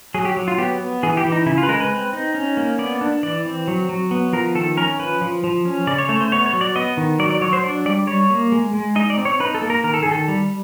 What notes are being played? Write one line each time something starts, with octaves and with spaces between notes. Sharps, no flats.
F#3 G#4
G4
F#3
F4
B3 G4
B3
E3 G#4
G4
E3
D#4
C#3 E4
F4
B4
G#3 A#4
B4
C4
D#4
C#4
A#3
B3 D5
D4
E3 D5
C4
F#3
F#3
B3
F3 A#4
D#3 A4
C#4 A#4
F3 B4
F3
F3
C#4
C#3 D5
C#5
A3 C#5
C5
B3 C#5
C#5
F#3
D5
B3 D#5
D#3
F#3 D5
D5
F#3 C#5
C5
D4 D5
G3 D5
G3 C#5
A#3
G#3
G#3
D#4 D#5
D5
C4
C#5
D#4 B4
A4
A#3
A#4
D#3 A#4
A4
D#3 G#4
A4
G3